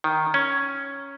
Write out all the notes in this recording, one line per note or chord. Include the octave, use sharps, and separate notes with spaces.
D#3
C#4